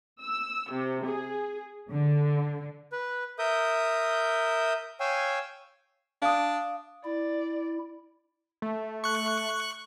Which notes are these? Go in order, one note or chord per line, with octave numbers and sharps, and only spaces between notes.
E6
C3
G#4
D3
B4
A#4 E5 D#6 G6
C#5 F5 G5 G#5 E6
D4 F5 D#6
E4 D5
A3
C#6 F#6